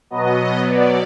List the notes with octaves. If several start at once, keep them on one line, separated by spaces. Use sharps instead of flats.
B2 F#3 B3 D#5
D5